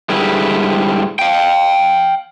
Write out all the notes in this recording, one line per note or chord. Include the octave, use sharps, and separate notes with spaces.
G#2 D3 G3 E4 G#4 B4
F5 G5